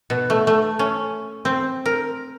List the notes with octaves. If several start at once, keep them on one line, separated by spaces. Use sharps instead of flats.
B2
A3
A3
C#4
C4
A#4